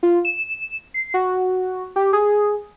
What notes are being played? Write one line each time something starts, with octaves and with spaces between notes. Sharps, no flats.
F4
E7
C7
F#4
G4
G#4